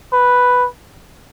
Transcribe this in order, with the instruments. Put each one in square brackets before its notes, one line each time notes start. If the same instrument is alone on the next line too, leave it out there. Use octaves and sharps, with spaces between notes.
[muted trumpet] B4